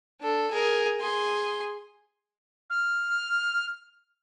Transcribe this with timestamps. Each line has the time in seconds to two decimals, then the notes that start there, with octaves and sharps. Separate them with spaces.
0.21 D4 A4
0.51 G#4 A#4
1.00 G#4 C6
2.70 F6